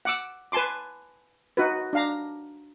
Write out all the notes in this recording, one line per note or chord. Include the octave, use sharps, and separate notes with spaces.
F#5 D6 E6
B4 G#5 A5 C6 D6
D#4 F#4 B4
D4 F5 A#5